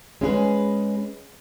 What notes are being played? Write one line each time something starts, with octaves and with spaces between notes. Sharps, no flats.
G#3 C#4 E4 G#4 B4